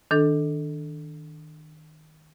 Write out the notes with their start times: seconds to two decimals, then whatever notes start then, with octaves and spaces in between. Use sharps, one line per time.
0.11 D#3 D4 A4